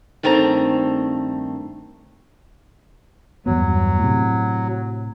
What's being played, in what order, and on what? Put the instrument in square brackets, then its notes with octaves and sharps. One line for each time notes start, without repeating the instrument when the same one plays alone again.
[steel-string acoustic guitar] G2 D#3 A3 C4 A#5
[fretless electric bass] E2 G2 B3 [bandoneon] F#3
[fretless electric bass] A2 C3